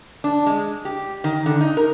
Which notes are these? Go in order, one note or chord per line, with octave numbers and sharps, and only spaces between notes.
D4
G#3
G4
D#3
D3
D#4
A#4